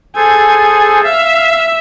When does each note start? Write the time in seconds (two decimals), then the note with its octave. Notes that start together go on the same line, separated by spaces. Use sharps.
0.15 G#4 A4 C5 G#5
1.04 E5 F5